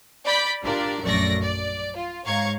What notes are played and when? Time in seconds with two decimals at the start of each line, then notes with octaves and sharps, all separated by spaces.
0.25 D5 B5 G6 B6
0.62 D4 F4 G4 A#4 D5
1.01 A#1 F#2 A3 D5 C#6 A#6
1.42 D5
1.96 F4
2.25 G#2 C#5 F5 A#5 C#6 G#6